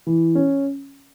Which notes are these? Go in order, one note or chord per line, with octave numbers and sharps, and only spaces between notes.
E3
C#4